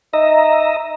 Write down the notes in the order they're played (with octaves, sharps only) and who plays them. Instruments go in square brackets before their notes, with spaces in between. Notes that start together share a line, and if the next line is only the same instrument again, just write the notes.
[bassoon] D#4 [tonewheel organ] D#5 E5 A#5